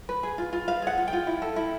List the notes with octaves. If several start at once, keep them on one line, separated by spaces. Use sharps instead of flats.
B4
G#4
F4
F4
B4 F5
G#4 F#5
F4
G5
F4
E4
A4
E4